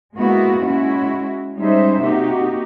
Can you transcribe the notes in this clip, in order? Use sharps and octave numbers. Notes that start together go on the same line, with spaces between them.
G#3 A#3 B3 E4 F#4
G#3 C#4 E4 F#4
G3 G#3 C#4 D#4 C5 E5
C3 A#3 D#4 F#4 G4